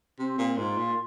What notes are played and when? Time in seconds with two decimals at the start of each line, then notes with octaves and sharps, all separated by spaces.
0.18 C3 C4
0.38 A#2
0.58 G#2 F4
0.77 A#2